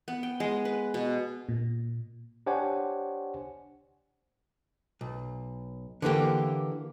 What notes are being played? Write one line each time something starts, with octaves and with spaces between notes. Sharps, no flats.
B3
G5
G#3
B4
B2
A#2
D4 G4 C5 C#5 F#5 G#5
B1
D3 E3 A#3 G4